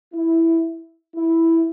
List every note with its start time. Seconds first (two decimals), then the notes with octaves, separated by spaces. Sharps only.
0.13 E4
1.16 E4